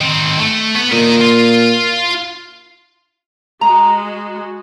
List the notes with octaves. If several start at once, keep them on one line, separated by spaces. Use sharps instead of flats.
D#3 C4
A3
B3
A#2 A#4 D#5
F4
G#3 F#4 A#5